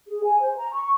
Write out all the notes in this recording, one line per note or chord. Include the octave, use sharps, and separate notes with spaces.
G#4
G#5
C5
A#5
C#6